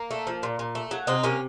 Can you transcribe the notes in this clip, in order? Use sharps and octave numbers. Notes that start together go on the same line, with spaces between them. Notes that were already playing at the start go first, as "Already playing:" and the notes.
Already playing: A#3
A3
F3
A#2
A#2
A3
F#3
C3 C4 D#4
C3 A#3 C#4